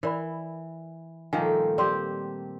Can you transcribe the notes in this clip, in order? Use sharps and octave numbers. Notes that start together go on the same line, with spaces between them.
E3 A#4 D5 B5
A#2 D#3 F3 G3 A3 A#3 G#5
C4 G4 D5 C6